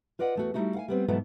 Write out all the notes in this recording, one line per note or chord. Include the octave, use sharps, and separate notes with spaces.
F4 B4 D5 D#5 F#5
E2 A3 F#4
G3 A3 D#4 E4 F#4
F5 F#5 G#5
G3 B3 C4
G#2 B2 E3 F#3 A3 B3